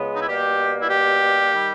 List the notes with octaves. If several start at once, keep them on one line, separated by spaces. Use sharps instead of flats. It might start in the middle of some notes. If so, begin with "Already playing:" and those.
Already playing: C#2 C#3 G#3 B3
D#4
E4
B2 G3 A#3 G4
E4
G4
D#3 G3